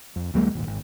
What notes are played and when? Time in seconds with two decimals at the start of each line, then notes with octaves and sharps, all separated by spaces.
0.16 F2
0.34 D2 F#3 G#3 A#3
0.55 D#1 G#1
0.67 G#1